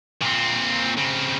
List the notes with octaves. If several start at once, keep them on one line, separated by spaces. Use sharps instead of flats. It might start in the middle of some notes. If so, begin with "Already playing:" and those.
A#2 C4
C#3 C4